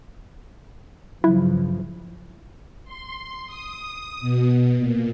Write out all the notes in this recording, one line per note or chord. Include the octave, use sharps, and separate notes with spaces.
G2 C#3 F3 F#3 E4
C6
D#6
B2
A#2